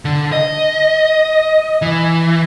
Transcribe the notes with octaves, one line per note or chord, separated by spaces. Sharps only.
D3
D#5
E3